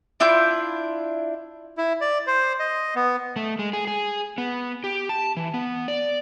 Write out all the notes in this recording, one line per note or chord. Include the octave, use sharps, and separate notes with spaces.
D4 E4 F4 G6
E4
D5
C5
D#5
B3
A3
G#3
G#4
G#4
B3
G4
A5
E3
B3
D5